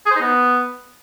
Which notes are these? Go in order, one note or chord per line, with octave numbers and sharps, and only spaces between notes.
G#4
C5
D#4
B3